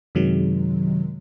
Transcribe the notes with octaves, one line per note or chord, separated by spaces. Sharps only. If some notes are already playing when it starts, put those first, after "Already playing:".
F#2 C3 D#3 F#3 G#3